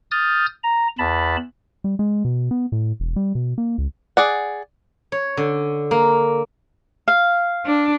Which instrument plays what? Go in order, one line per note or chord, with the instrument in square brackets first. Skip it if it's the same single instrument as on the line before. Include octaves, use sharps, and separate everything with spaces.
[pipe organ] D#6 F6 G6 A6
A#5
E2 A5 B5
[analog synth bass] G3
G#3
B2
B3
A2
E1
G3
B2
A#3
C#2
[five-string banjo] G#4 D5 F#5
[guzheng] C#5
D3
A#3
[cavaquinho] F5
[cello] D4